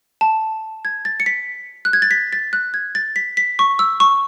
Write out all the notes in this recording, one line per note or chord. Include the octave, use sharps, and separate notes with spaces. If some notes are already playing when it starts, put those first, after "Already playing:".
A5
G#6
A6
C#7
B6
F#6
G#6
A6
B6
A6
F#6
G#6
A6
B6
B6
C#6
E6
C#6